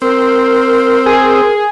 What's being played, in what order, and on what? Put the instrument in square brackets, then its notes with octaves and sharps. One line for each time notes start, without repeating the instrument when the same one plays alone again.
[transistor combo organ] C4 [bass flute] A#4
[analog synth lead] G#4